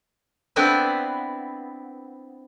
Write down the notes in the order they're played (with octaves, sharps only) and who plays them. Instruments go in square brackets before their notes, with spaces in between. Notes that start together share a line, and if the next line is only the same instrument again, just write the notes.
[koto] B3 C4 D4 E4 B4